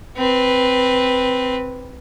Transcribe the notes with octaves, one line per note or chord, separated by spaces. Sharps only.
C4 B4